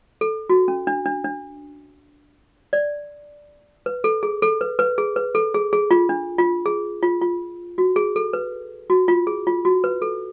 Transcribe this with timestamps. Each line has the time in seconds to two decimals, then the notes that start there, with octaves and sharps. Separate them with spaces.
0.21 A4
0.50 F#4
0.68 C#4
0.87 D4
1.06 D4
1.24 D4
2.73 D5
3.86 B4
4.04 A4
4.23 G#4
4.42 A4
4.61 B4
4.79 B4
4.98 G#4
5.16 B4
5.35 A4
5.54 G#4
5.73 G#4
5.91 F4
6.09 D4
6.38 F4
6.66 G#4
7.03 F4
7.22 F4
7.78 F#4
7.96 G#4
8.16 A4
8.33 B4
8.90 F#4
9.08 F4
9.27 G#4
9.47 F4
9.65 F#4
9.84 B4
10.02 A4